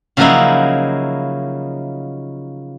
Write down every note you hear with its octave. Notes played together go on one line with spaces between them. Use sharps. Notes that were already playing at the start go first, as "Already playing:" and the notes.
C#3 F3 F#3 A#3 D#4 E4